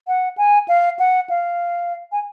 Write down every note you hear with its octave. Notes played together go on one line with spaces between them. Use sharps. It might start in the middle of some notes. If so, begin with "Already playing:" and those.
F#5
G#5
F5
F#5
F5
G#5